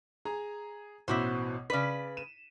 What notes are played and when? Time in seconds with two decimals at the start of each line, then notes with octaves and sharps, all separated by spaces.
0.25 G#4 A#5
1.08 A1 B2 E4 F#4 C5 D6
1.70 C#3 B4 D5 B6
2.17 D#7 E7